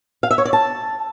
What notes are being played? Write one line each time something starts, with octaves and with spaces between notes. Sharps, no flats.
F5
E5
C#5
D5
A5